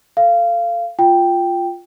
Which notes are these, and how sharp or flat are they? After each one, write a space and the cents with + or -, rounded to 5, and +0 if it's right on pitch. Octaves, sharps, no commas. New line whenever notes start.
A4 +0 F5 -20
F4 +0 G5 +0